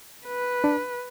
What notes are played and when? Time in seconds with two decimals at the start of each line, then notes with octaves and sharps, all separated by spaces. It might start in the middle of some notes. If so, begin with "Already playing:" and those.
0.26 B4
0.64 D4